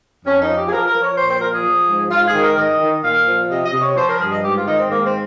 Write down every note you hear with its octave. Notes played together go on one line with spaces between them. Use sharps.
F2 C#4
D#4
F3
G4
G#4
F3 A#4
A#4
F3
C#5
A#2 C5
C5
F3 A#4
G#4
F3
G#2
G#2 F4
G#4
D#3
A#4
D#3 D#5
D#3
A#2 F5
F3
C3 D#5
D#5
C3
C#5
F3 C5
A#4
G2 G#4
D#5
G#2 G4
F4
D#3 D#4
C4
G#2 A#3
C4